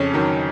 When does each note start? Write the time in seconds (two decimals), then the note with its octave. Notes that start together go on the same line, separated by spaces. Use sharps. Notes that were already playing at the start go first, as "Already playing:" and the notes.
Already playing: F2 C#3 C#4
0.14 D#3 F#3